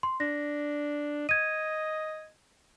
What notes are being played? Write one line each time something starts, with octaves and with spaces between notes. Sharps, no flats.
C6
D4 A#6
D#5 G#6 D#7